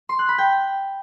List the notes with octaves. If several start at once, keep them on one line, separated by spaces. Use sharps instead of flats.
C6
F#6
B5
G5